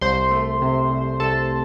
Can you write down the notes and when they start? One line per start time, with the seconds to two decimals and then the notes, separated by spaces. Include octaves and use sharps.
0.01 C2 C5 C6
0.31 A3
0.62 C3
0.90 C2
1.20 C2 A4 A5